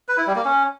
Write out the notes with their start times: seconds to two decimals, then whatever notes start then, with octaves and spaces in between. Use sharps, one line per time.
0.08 B4
0.18 E4
0.27 G3
0.36 A#3
0.45 C#4